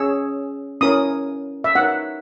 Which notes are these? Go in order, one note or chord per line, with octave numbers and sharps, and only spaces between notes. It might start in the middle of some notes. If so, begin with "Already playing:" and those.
Already playing: C#4 G#4 C#5 E6
C#4 E4 A#4 C#5 D#6
E5
D#4 A#4 C#5 F#5